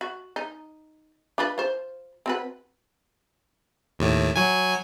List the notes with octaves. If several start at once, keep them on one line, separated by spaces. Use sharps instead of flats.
F#4
D#4
D4 F4 B4
F4 C5
C4 F#4 B4
D#2 A2
F#3 G#5